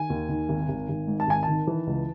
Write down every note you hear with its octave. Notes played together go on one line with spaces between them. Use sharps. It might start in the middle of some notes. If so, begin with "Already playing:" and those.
Already playing: D#3 G#5
D#2
D#3
G#1
G#1
G#1
G#2
A5
G#1 G#5
D#3 A5
E3
C#2